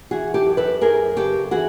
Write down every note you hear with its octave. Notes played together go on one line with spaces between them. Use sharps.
E3 F#4 G#4
G4 A4
F#2
A4 B4
F#2 G#4 A#4
C#3 G4 A4
E3 F#4 G#4